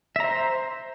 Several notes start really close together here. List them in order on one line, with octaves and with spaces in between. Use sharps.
E5 A#5 C5